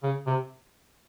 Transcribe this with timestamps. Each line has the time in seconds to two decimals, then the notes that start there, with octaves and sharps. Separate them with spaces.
0.03 C#3
0.27 C3